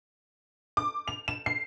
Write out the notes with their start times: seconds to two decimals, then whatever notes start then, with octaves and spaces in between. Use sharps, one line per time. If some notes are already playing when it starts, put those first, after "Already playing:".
0.77 D6
1.08 F7
1.28 E7
1.46 C7